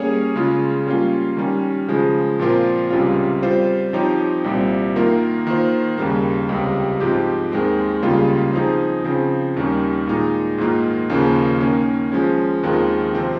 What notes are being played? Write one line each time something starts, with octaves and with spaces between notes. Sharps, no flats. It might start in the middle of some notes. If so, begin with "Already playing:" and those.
Already playing: G3 A#3 C#4 G#4 C#5
C#3 G#3 C#4 F4
G3 A#3 C#4 F4
D#3 G3 C#4
C#3 F3 G#3
A#2 F3 C4 F4 A#4
C#2 C3 G3 C#4 F4
G3 C4 F4 C5
F3 C4 D#4 G4 C#5
C2 A#2 G3 C4
D#3 A#3 F4 A#4
D#3 A#3 F4 C5
D#2 C#3 G3 A#3
C#2 C3 G3
G#2 F3 C4 G4
D#2 D#3 G#3 C4
C#2 C#3 G3 A#3 F4
F3 C4 D#4 G#4
C#3 F3 C4
D#2 D#3 G3 C#4
A#2 G#3 D#4
G#2 D#3 A#3 F4
D#2 C#3 F3 A#3 C#4
D#3 A#3 C#4
F3 G#3 C#4
D#2 D#3 G#3 C4 F4
C3 F3 C4